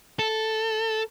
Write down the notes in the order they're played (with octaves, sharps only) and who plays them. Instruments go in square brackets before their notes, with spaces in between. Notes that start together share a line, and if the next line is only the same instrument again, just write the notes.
[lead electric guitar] A4